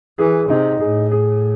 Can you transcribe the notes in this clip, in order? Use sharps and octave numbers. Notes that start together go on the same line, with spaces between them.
E3 G#4
C3 D#4
A2 G#4
G#4